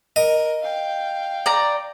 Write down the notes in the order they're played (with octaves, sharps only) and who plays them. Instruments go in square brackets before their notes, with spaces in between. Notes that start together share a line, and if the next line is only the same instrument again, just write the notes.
[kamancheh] A#4 [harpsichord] D#5
[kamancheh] F5 G5
[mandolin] D5 A#5